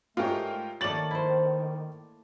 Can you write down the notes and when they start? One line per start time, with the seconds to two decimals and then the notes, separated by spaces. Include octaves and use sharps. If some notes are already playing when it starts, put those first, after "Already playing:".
0.17 G#2 A3 F4 G4 A#4 C#5
0.81 D#3 A3 A#3 C#5 D5 A6 F#7
1.11 E4 C5